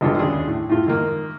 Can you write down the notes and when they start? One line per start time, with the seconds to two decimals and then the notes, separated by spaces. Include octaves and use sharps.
0.01 G#1 B2 D3 G#3 F4
0.17 D#2 C#4 D4 G#4 C6
0.47 A2
0.69 A2 F4
0.86 G#2 D#3 A#3